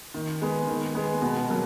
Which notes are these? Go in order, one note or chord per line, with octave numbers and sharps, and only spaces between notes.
D#3
G#3 B3
D#3
G#3 B3
B2
F#3 A#3